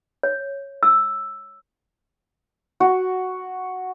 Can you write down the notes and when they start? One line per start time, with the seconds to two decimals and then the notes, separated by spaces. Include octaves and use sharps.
0.23 C#5
0.83 E6
2.80 F#4